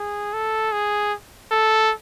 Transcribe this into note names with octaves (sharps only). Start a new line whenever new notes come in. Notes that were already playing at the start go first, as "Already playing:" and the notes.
Already playing: G#4
A4
G#4
A4